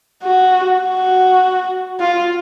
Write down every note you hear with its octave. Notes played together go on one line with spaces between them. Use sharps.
F#4
F#4
F4